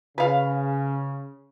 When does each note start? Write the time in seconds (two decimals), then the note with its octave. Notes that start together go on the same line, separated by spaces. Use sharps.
0.18 C#3 B4 F5